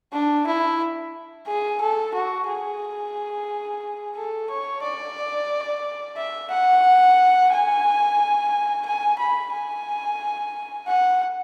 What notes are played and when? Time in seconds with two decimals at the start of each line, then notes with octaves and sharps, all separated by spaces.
0.13 D4
0.47 E4
1.47 G#4
1.80 A4
2.14 F#4
2.48 G#4
4.15 A4
4.50 C#5
4.82 D5
6.17 E5
6.50 F#5
7.51 G#5
8.86 G#5
9.19 B5
9.53 G#5
10.87 F#5